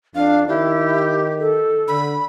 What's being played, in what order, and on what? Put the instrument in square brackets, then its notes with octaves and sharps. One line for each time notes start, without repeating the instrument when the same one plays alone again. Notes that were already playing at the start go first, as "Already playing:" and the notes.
[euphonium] F2 [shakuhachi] D4 [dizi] F5
[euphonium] D#3 [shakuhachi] E4 [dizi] G4
[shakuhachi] A4
[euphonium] D3 [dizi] B5